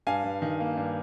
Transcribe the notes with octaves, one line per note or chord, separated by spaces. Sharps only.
G2 F5 G#5
G2
D#3
A#3
G2